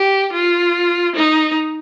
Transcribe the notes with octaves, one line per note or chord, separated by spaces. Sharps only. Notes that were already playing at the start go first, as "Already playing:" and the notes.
Already playing: G4
F4
D#4